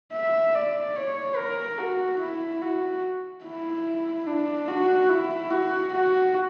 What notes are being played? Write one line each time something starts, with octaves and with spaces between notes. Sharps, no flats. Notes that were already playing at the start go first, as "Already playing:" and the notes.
E5
D5
C#5
A#4
F#4
E4
F#4
E4
D4
F#4
E4
F#4
F#4